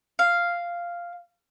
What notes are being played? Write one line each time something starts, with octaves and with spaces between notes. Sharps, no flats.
F5